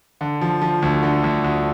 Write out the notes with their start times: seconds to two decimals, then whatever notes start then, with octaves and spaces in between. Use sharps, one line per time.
0.21 D3
0.41 F3
0.62 F3
0.82 D2
1.03 D3
1.24 D2
1.44 D2